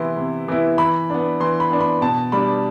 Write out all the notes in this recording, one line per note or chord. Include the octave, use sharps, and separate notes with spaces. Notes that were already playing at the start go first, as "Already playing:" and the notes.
Already playing: C3 E3 B3 E4 C6
C3
E3 B3 E4
E3 B5
B3 D4
E3 C6
B5
B3 D4
B5
B2 A5
G3 D4 B5